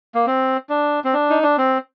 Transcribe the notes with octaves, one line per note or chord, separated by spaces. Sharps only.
A#3
C4
D4
C4
D4
D#4
D4
C4